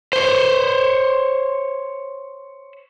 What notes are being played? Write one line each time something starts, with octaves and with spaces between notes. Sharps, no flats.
C5 C#5